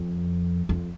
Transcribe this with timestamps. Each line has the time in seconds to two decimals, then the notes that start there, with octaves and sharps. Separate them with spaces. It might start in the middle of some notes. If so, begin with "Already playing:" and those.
Already playing: F2
0.69 F2